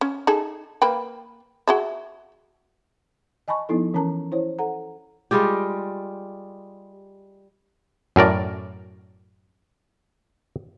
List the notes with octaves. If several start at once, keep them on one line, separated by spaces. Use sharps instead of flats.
C#4
D#4 G#4 A4
A#3 B4 G5
F#4 G#4 E5
D#5 G#5 A5 B5 C#6
F3 B3 D#4 E4 A4
E3 C#4 A#4 A5 A#5
E4 C5 C#5
A4 F#5 A#5
G3 G#3 F4 G4
F#2 A2 A#4 D5